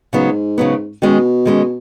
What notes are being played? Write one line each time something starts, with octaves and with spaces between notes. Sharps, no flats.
G#2 C#3 F#3 B3
C#3 F#3 B3
B2 D#3 G#3 C#4
D#3 G#3 C#4